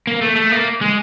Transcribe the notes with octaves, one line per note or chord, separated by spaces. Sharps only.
A#3
A3
A3
A#3
G#3